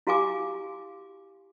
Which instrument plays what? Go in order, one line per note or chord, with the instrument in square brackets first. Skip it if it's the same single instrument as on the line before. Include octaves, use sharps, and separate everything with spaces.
[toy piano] E4 F#4 G4 F5 G#5 D6